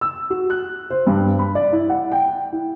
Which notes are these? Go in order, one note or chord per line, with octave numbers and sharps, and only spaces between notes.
E6
F#4
F#6
C5
G2
B5
D5
E4
F#5
G5
E4